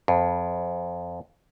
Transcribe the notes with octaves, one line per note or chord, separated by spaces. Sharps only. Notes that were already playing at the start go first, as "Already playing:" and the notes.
F2